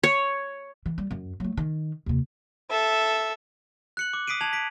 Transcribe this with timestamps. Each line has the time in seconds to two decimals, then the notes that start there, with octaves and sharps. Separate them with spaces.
0.03 C#5
0.86 E3
0.98 G3
1.11 F#2
1.40 F#3 A3
1.57 D#3
2.06 D#2 C3
2.71 A4 E5
3.97 F#6 C#7 F#7
4.13 D6
4.27 D#6 B6 C7 D7 D#7
4.41 A5 G#6 F7 F#7
4.53 B6 D7